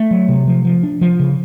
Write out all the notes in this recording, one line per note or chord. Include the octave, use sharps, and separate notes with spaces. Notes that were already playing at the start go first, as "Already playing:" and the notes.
Already playing: A3
F#3
C3
F3
F3
D4
F3
C#3